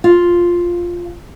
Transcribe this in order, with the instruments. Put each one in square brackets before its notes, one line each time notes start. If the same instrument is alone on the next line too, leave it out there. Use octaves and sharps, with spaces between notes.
[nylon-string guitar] F4